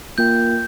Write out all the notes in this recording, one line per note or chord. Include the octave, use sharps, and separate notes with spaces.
A#3 F4 A#4 G5 G6